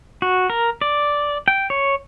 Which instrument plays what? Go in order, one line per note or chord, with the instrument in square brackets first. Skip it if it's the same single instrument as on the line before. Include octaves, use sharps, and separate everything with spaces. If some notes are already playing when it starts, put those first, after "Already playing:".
[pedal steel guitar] F#4
A#4
D5
G5
C#5